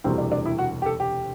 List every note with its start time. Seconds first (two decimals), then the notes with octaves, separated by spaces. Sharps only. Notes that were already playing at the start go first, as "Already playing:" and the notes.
0.04 E1 D2 C3 E3 G3 C4
0.18 D4
0.32 D4
0.46 E4
0.59 F#4
0.82 G4
0.86 A4
1.00 G4